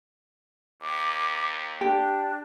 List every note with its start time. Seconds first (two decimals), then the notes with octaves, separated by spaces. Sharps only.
0.82 D#2 D6
1.81 D4 G4